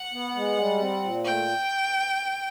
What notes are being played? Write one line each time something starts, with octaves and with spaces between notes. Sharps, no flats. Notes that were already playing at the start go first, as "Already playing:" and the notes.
Already playing: F#5
B3
G#3
G3
C4
A#2
A3 G5